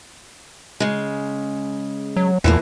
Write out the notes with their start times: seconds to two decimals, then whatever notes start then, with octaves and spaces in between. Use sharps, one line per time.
0.80 C#3 G#3
2.17 F#3
2.44 E2 E3 F3 A#3